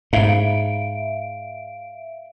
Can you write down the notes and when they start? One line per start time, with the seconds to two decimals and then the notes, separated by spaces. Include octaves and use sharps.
0.13 G#2 E5 F5 D7